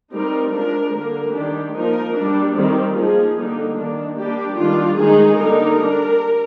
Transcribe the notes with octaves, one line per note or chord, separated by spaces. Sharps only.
G3 C4 D#4 A#4
F3 G#3 D4 A#4
D3 G3 A#3 A#4
D#3 G3 D4 G4
F3 A#3 D#4 A#4
G3 D4
D#3 G3 C4
F3 A#3 D#4 G#4
D3 G3 A#3 D#4
D#3 A#3 D4
G3 A#3 D4 G4
D#3 G3 D4 F4
D#3 G#3 D#4 G#4
D3 G3 A#3 D#4 A#4
G3 D4